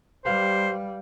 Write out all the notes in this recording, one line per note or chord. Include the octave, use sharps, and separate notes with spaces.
G3 G4 B4 C5 F5